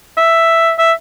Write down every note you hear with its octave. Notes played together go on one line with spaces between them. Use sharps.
E5
E5